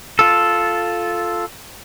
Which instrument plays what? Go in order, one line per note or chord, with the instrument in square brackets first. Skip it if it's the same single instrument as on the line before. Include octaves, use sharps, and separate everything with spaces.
[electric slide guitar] F4 A4